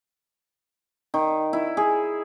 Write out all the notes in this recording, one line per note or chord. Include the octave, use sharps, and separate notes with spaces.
D#3
E4
G#4